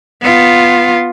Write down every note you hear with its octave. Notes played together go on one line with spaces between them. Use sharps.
B3 F4